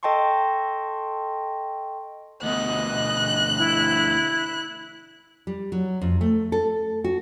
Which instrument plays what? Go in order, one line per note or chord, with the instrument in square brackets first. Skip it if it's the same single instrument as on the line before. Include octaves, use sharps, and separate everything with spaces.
[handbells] A4 D#5 G5 A5 C6 C#6
[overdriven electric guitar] D2 B2 [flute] D#5 [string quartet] F#6
[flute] E4
[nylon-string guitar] G3
F#3
F2
A3
A4
F#4